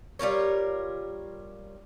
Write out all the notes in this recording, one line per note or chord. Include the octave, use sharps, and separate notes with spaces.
G3 F4 A#4 C#5